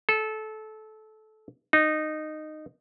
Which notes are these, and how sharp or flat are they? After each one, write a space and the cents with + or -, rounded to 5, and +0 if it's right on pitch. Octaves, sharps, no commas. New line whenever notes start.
A4 -20
D#4 -15